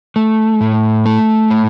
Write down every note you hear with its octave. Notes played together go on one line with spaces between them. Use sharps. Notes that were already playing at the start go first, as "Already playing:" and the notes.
A3
A2
A3
A2